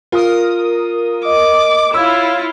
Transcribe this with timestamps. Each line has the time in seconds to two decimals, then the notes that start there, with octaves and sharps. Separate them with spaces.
0.12 F4 A#4 D#6
1.25 D#5 D6
1.94 E4 F4 C#5 F5 E6